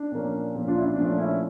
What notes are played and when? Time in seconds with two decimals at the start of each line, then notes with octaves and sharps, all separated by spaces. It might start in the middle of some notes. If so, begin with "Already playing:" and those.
Already playing: D4
0.12 A#2 F3 A#3 C#4
0.55 A#2 F3 A#3 C#4
0.68 D4 F4
0.78 E4
0.82 D4
0.96 A#2 F3 A3 C#4 D4
1.18 C#4 E4